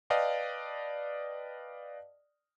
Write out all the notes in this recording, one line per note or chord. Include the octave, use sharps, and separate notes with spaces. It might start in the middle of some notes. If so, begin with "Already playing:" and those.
B4 D5 D#5 F5 G5 A5